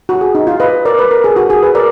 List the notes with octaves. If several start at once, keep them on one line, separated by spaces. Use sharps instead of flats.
F#4
G#4
D#4
F4
B4 D#5
A#4 D5
B4
A#4
G#4
F#4
G#4
B4
A#4 D5